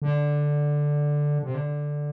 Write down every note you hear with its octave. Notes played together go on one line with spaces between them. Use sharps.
D3
C3
D3